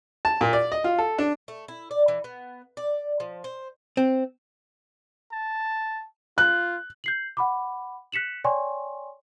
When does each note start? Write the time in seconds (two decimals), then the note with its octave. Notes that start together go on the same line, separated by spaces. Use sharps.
0.25 A5
0.41 A#2
0.53 D5
0.72 D#5
0.84 F4
0.98 A4
1.18 D4
1.48 A3
1.68 E4
1.91 D5
2.08 E3
2.24 B3
2.77 D5
3.20 F3
3.44 C5
3.97 C4
5.32 A5
6.38 F4 F#6
7.04 G6 C7 F#7
7.37 F#5 B5 D6
8.12 F#6 B6 C#7 E7 F#7
8.44 C#5 D5 G5 G#5 C6 C#6